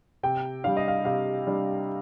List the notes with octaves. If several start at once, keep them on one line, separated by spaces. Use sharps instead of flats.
C3 G5
G3 D4 F5
D#5
F5
C3 F5
G3 D4